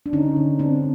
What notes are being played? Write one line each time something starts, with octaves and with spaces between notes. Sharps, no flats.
D4
D3 C#4 D#4
D3
D3 C4 D4